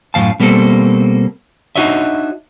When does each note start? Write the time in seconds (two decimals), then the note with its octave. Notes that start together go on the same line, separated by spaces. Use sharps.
0.14 F#2 A2 E3 F5 A5
0.40 B2 G3 A#3 C4 A4
1.76 D4 D#4 F#4 C#5 D#5 E5